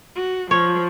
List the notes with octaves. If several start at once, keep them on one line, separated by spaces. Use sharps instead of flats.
F#4
F3 C#5